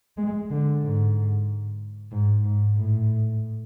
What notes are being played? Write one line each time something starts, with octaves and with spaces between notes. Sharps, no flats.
G#3
D3
G#2
G#2
G#2
A2